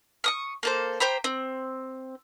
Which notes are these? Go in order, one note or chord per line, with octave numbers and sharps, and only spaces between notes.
C#6 D#6 F6
A#3 A4 C5
G4 C5 A#5 B5
C4